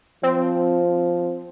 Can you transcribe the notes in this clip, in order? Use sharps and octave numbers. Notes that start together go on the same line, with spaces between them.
F3 C4